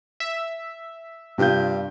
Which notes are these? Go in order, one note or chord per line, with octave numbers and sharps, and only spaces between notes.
E5
G2 C3 F4 G6